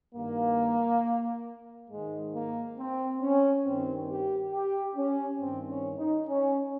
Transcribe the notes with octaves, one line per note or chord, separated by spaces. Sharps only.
G2 D#3 A#3
G#2 D#3 G#3
A#3
C4
C#4
G2 D#3 C4
G4
G4
C#4
G2 D#3 C4
C#4
D#4
C#4